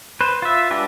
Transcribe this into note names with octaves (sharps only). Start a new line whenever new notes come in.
B4 C5
F4 E5
G#3 D4 G4 B4